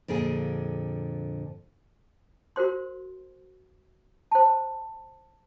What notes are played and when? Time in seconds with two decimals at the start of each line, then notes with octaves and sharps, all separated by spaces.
0.08 F2 A#2 D3 G#4
2.56 F#4 A#4 C5 C6
4.31 C5 A5